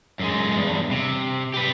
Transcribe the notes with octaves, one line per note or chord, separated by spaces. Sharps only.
F#2 G#3
E2 G2
C3
G4 B4